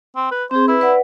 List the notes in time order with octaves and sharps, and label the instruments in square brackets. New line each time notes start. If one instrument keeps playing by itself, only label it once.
[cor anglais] C4
B4
[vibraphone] C4 G#4 [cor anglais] C5
[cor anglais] E4 [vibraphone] B4
[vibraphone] B4 D5 F#5